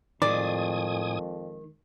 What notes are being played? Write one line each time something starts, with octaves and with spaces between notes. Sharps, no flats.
F2 A2 D#3 G#3 D5 G#5 D#6